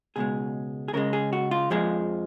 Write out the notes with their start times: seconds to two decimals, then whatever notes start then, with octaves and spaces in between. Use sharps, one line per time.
0.16 C#2 B2 G#3 G#4
0.88 G#4
0.93 C#2 C#3 G#3 A#4
1.13 G#4
1.33 F#4
1.51 F4
1.70 F2 F3 G#3 G#4